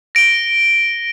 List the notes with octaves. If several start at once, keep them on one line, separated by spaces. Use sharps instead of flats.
A#6 D7 G7